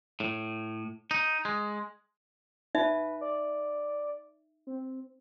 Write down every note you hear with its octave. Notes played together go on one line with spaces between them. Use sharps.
A2
D#4
G#3
D#4 B4 E5
D5
C4